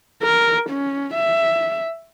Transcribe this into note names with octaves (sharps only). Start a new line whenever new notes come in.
A#4
C#4
E5